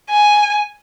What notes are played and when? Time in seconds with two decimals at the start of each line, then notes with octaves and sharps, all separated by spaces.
0.10 G#5